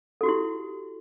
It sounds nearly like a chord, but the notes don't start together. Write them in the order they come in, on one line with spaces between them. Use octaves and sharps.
A4 F#4 G4 E4